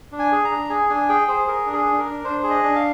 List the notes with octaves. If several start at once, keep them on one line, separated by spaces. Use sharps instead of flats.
D4
G#5
G#4
A#5
D4
G#4 G#5
D4 G#5
G#4 G5
G#4 C5
G#4 A#4
D4
G#4
D4
A#4
D4
D4 C5
G#4
D#5
D4
F5